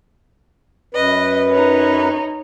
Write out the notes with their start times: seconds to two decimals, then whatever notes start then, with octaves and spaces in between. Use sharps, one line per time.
0.94 F#2 B4 D#5
1.51 C#4 D#4